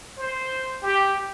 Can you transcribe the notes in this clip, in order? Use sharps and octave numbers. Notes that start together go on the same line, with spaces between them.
C5
G4